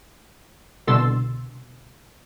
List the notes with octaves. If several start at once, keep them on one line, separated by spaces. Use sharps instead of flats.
C2 B2 D3 C6 E6 A6